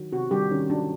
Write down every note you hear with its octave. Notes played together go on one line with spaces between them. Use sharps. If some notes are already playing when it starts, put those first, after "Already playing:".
Already playing: D#3 F#3
C3 F#4
D#3 G3 G4
D#3 C#4
F#3 D4